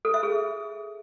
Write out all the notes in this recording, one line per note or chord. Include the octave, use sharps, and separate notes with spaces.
A4
E5
G#4